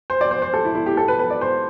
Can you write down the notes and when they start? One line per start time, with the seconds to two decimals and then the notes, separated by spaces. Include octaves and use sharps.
0.10 C5
0.21 D5
0.31 C5
0.42 C5
0.54 A4
0.65 E4
0.75 E4
0.86 G4
0.97 A4
1.08 B4
1.19 B4
1.30 D5
1.41 C5